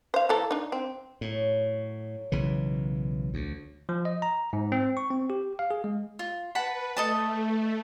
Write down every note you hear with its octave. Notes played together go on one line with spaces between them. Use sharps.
C5 F5
E3 A4 A#4
D4 D#4
C4
F#2 A2 F#3
B1 C#3 E3
D2
F3
D#5
A#5
G#2
C4
C#6
C4
G4
F5
G#4
G#3
F4
B4 F#5 A5 B5
A3 A4 D#5 A5